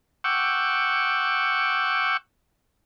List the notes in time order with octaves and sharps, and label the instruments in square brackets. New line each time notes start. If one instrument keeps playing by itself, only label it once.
[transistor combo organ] F#5 G5 C#6 D6 E6